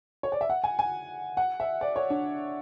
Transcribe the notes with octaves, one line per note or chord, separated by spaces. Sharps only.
C#5
D5
E5
F#5
G#5
G#5
F#5
E5
D5
C#5
D4